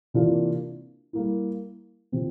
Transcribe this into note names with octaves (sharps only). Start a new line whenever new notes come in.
C3 E3 A#3 D4 F4
G3 A#3 E4
C3 F3 C4